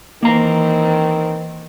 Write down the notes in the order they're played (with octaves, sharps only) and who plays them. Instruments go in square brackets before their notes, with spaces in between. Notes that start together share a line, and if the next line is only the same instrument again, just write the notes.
[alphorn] D#3 [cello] E3 C4 [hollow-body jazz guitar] A#3 A#5